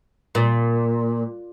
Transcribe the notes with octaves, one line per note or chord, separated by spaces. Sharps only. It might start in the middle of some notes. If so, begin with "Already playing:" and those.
A#2